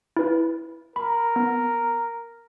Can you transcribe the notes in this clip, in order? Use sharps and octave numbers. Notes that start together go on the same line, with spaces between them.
E4 B4
A#4 B5
B3